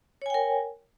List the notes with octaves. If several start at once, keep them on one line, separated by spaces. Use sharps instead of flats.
A#4 C#5 G5 G#5